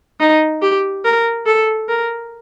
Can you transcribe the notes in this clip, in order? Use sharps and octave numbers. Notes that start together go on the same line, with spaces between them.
D#4
G4
A#4
A4
A#4